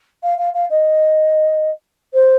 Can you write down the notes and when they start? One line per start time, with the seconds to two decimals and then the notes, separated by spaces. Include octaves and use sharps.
0.23 F5
0.38 F5
0.54 F5
0.70 D#5
2.13 C5